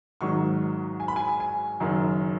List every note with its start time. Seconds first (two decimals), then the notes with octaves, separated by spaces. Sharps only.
0.21 G#1 G#2 D#3 F#3 C#6
1.00 G#5
1.08 B5
1.16 G#5
1.40 G#5
1.80 F#1 F#2 D#3 F#3